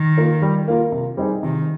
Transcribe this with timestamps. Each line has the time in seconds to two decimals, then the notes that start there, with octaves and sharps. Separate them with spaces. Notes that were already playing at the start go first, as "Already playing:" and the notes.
Already playing: D#3
0.17 A#3 F4 A#4
0.42 G3
0.68 A#3 F4 A#4
0.92 C3
1.17 G3 C4 D#4 G#4
1.43 C3 D#3